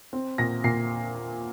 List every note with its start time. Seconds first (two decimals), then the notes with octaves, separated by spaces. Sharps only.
0.13 C4
0.38 A#2 A#6
0.64 A#2 C7